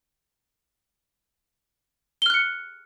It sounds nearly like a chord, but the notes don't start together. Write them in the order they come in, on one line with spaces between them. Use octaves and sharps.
G7 F6 F#6 C#7